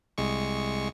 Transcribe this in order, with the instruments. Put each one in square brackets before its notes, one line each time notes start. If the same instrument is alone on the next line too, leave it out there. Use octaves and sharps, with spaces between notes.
[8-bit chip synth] C2 G#3 C#6